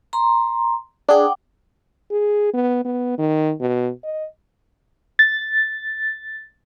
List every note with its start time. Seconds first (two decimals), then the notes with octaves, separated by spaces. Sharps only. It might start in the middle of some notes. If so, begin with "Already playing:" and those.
0.13 A#5 C6
1.09 D4 G#4 F#5 G5 D6
2.11 G#4
2.54 B3
2.85 B3
3.18 D#3
3.60 B2
4.04 D#5
5.19 A6